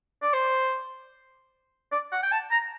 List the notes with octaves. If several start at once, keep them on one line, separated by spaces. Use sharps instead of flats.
D5
C5
D5
F#5
G5
A5
A#5